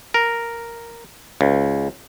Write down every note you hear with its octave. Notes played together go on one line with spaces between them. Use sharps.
A#4
C#2